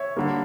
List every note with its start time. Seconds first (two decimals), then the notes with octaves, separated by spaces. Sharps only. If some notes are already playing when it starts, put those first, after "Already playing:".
Already playing: C#5 E5
0.17 D3 G3 A#3